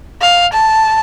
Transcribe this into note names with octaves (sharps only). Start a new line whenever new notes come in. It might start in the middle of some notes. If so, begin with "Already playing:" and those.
F5
A5